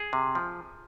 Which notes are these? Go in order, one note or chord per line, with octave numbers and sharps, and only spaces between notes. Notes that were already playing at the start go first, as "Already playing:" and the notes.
Already playing: G#4
C3
F3